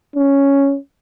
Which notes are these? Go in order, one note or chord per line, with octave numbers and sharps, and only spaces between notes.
C#4